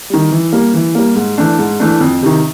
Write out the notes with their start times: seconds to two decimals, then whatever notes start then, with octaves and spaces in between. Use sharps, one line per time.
0.10 D#3 G3
0.31 E3
0.53 G3 A#3
0.74 E3
0.95 G3 A#3
1.16 G#2
1.38 E3 A3 D4
1.59 G#2
1.80 E3 A3 D4
2.01 F2
2.22 C3 D#3